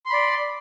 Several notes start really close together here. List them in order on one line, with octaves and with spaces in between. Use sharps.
C6 B5 D5